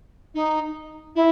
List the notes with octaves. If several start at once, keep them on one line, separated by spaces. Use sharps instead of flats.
D#4
E4